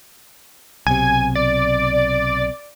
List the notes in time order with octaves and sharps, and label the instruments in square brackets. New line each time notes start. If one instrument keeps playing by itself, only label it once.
[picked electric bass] B1 C3 [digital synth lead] G#5
[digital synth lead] D5